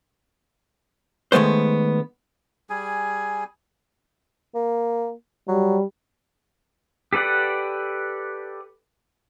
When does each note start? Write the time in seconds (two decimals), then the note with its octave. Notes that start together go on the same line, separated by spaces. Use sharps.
1.32 D#3 G#3 A3 B3 C5
2.70 G3 G#4 G#5
4.55 A#3
5.49 F#3 G3
7.13 G4 A4 B4 D5 F#5